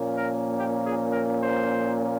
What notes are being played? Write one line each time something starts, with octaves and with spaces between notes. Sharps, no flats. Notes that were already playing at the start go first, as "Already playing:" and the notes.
Already playing: A#2 F3 A#3 C#4
A#4
G4
G#4
A#4
C5